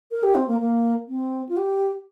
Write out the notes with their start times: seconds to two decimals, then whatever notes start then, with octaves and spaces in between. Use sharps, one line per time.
0.11 A#4
0.23 G4
0.35 C4
0.47 A#3
0.60 A#3
1.08 C4
1.49 F4
1.57 G4